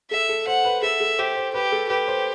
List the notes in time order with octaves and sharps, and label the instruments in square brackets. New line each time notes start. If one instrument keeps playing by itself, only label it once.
[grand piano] A4 [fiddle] E5
[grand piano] A4
[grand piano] C5 [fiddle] F#5
[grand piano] B4
[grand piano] A4 [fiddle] E5
[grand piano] A4
[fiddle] G4 [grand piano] C5
[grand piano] C5
[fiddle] G4 [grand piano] B4
[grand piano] A4
[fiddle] G4 [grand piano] B4
[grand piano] C5